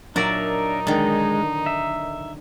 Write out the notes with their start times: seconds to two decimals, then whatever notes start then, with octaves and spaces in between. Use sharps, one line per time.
0.16 A#2 F#3 D4 D#4 A#4 D5 E5
0.87 D3 D#3 G#3
1.66 E5